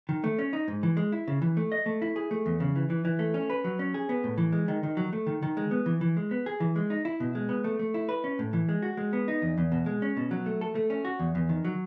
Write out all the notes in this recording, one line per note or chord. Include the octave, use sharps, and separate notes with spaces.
D#3
A3
C#4
D#4
G#2
E3
G#3
E4
C#3
E3
A3
D#5
A3
E4
G#4
A3
E2
C#3
E3
E3
E3
A3
C#4
B4
F#3
C#4
G#4
B3
A2
E3
G#3
D#3
D#3
F#3
A3
D#3
D#3
G#3
B3
E3
E3
G#3
B3
G#4
E3
G#3
D#4
E4
B2
G#3
B3
A3
A3
E4
B4
C#4
A2
E3
G#3
F#4
G#3
B3
D#4
E2
E2
B2
G#3
C#4
B2
F#3
A3
A4
A3
C#4
F#4
E2
E2
D#3
F#3